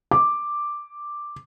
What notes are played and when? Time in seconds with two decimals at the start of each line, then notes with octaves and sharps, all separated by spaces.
0.11 D6